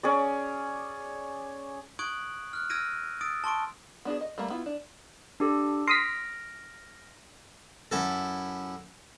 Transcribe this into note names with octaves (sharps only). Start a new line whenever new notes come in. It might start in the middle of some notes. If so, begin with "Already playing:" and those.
C#4 G#4 D5
C#6 D#6 F#6 G#6 D7 F#7
F6 F#6
E6 F6 G#6 A#6 D7 D#7
D#6 E6 A6 D7
A5 C6 C#6 D7
B3 D4 F#4 G#4
D#5
G3 A3 A#3
B3 E4 F4
D4
D4 G4 A4
C6 D#6 F6 A#6 B6 D7
F#2 E4 A4